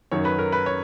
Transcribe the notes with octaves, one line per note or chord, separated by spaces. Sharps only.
F#2 D#3 F#3 C#5
B4
A#4
B4
C#5